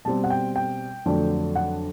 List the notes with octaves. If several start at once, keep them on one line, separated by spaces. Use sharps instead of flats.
B2 G3 C4 A5
F#5
G5
G5
F2 D3 F#3 A3 D4
F#5